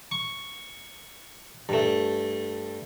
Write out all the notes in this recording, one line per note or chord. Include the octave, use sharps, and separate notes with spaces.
C#6
G2 A3